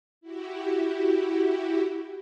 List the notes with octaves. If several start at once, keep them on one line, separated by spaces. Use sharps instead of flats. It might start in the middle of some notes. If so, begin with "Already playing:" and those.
E4 F#4 G4